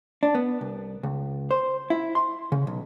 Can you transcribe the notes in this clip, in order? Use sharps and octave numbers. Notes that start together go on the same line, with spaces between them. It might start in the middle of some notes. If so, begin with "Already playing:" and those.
D4
B3
C2
C#2
C5
E4
C6
C#3
B1